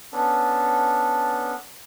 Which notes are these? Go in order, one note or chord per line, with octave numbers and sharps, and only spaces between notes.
B3 C#4 D4 A4